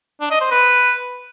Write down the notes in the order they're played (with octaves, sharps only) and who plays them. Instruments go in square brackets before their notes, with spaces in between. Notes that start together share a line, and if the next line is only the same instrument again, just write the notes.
[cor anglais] D4
D#5
C5
B4